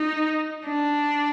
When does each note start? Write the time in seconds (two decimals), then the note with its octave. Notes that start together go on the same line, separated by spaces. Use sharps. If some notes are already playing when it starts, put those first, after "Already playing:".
Already playing: D#4
0.66 D4